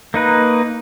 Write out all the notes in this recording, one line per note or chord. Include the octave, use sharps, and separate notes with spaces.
A#3 D#4 B4